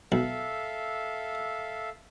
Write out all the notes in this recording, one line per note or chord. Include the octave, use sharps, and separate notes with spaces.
B1 A4 E5 F5